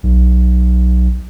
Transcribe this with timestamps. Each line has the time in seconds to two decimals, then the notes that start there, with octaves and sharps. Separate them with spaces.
0.03 B1